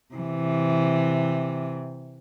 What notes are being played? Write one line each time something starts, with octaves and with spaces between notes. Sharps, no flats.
C3 E3